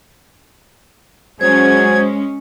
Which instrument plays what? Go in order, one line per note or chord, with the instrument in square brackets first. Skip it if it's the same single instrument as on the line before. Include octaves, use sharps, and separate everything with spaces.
[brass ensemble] F#3 G#4 [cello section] G#3 C#4 [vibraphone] C5 [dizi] G#6